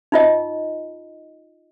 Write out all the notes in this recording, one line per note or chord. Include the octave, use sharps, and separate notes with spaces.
D#4 F4 D#5